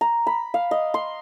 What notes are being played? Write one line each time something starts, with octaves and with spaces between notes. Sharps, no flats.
A#5
B5
F5
D#5
C6